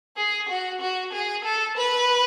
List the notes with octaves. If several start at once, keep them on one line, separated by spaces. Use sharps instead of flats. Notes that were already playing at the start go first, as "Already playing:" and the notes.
G#4
F#4
F#4
G#4
A4
B4